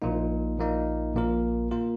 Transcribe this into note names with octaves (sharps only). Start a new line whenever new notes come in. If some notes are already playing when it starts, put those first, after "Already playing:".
A#1 A#2 A#3 D#4
A#1 A#2 A#3 D#4
A#1 A#2 A#3 F4 A#4
A#2 A#3 F4 A#4